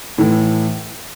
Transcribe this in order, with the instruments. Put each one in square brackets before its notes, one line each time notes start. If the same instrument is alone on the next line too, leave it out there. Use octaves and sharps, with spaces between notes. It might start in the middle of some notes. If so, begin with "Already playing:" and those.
[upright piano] A2 E3